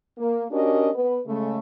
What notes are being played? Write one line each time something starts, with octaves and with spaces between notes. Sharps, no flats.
A#3
C#4 D4 F#4 G4 A#4 D#5
B3 B4
C#3 G#3 A3